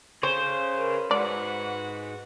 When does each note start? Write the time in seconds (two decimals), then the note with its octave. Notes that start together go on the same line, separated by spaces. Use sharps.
0.23 G#4 C5 C#5
0.76 A#4 B4
1.11 G#2 F#4 B4 D5